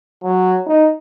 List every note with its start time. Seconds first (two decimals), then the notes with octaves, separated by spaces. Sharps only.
0.23 F#3
0.66 D#4